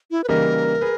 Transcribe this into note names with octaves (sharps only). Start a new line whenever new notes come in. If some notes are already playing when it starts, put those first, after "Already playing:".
E4
B4
C#3 E3 G3 A#3 D#4 A#4
G#4 B4